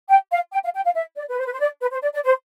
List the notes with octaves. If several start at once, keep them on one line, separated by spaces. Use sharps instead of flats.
G5
F5
G5
F5
G5
F5
E5
D5
B4
C5
B4
C5
D5
B4
C5
D5
D5
C5